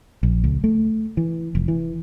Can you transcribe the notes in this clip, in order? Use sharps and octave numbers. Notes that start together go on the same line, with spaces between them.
A#1
C#2
A3
E3
F1
E3